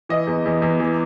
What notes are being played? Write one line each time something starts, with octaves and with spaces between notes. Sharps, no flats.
E3 D#5
E2
E2
E2
E3